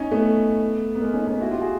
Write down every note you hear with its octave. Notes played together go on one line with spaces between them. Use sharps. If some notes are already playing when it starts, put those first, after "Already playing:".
Already playing: C#4 D#4
A3 B3
B3
G#3 A#3
C#4 D#4
B3 C#4
E4 F#4
F4 G4
F#4 G#4